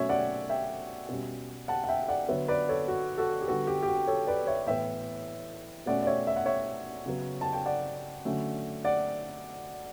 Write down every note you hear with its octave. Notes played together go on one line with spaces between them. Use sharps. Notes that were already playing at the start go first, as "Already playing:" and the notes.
Already playing: B2 F#3 A3 C#4 C#5 E5
D5 F#5
E5 G5
B2 G3 C#4
F#5 A5
F#5
E5 G5
D5 F#5
D3 F#3 B3 C#5 E5
B4 D5
A4 C#5
F#4
F#4 A4
G4
D3 G3 B3 F#4 A4
G4
G4
F#4
A4 C#5
B4 D5
C#5 E5
A2 E3 B3 E5 G5
B2 A3 C#4 D5 F#5
D5
C#5 E5
E5
F#5
C#5 E5
C#3 F#3 B3
A5
G5
D5 F#5
D3 F#3 A3 C#4
D5 F#5